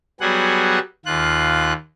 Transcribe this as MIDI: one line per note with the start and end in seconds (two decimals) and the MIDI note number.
0.21 0.79 54
0.21 0.79 55
0.21 0.79 59
0.21 0.79 68
0.21 0.79 78
1.06 1.73 39
1.06 1.73 65
1.06 1.73 90